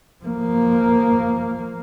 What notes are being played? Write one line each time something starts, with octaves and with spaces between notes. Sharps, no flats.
F3 A#3